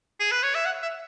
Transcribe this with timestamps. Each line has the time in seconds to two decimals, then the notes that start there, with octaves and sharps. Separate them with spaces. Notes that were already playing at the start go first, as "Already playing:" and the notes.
0.20 G#4
0.31 B4
0.43 C#5
0.55 E5
0.66 F#5
0.82 E5